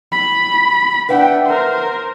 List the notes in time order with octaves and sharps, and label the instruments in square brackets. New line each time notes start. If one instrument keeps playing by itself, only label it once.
[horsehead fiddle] B5
[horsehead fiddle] D4 G5 [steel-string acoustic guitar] B4 E5 F#5
[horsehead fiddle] A#4 C5